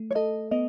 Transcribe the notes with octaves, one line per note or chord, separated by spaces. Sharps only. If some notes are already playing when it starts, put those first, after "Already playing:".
Already playing: A3
C#5
A4 D#5
B3 D#5